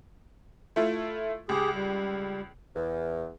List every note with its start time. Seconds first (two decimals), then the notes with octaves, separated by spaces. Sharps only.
0.76 A3 E4 F4
1.49 C#2 G4 G#4
1.74 G3
2.75 E2